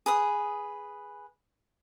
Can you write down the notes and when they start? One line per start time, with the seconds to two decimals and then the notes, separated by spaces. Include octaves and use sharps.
0.06 G#4 B4 D#6